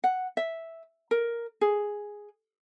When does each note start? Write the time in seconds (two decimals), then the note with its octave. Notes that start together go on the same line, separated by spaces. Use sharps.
0.04 F#5
0.37 E5
1.11 A#4
1.61 G#4